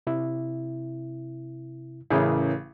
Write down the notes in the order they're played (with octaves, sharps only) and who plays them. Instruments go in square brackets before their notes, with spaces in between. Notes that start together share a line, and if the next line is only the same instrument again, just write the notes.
[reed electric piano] C3 E4
[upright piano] A1 C#3 [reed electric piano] E4 G#4 A#4